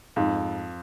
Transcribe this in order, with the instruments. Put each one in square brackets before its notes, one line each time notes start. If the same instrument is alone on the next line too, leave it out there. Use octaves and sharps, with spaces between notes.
[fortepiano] F2 [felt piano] G#2